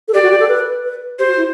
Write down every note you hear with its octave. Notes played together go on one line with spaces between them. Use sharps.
A4
G4 D5
F#4
G4
A4
B4
B4
G4 C5
F#4
E4